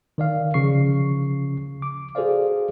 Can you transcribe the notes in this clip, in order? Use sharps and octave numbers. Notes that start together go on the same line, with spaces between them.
D#3 D5 F5
C#3 F3 C#6 C7
D6
F#4 G#4 A4 C5 D5 F5